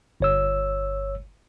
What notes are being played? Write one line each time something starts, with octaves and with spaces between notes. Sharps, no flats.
G1 C#5 E6